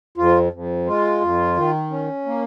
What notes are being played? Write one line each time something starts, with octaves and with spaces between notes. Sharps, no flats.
F2 F4
F2
G#3 F4
F2
D#3
C#4
A#3